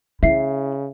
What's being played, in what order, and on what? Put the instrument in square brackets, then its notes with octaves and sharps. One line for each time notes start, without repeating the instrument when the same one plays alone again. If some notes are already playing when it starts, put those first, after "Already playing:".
[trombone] C#3 [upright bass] E4 [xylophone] E5 C7